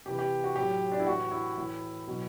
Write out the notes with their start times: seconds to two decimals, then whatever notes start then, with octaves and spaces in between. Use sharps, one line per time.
0.06 C3 G4
0.10 E3
0.19 G4
0.44 F#4
0.56 A2 F#3 G4
0.92 D4
1.00 E4
1.06 A2 E3 F#4
1.31 E4
1.56 A2 E3
2.07 B2 F#3